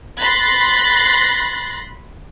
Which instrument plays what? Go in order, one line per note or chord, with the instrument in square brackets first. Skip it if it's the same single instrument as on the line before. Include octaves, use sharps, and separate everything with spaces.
[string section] B5 C6 F#6 A6 A#6 C7